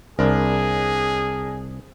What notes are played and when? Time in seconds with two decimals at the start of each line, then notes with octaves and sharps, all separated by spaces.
0.19 C2 D4 G#4 A#4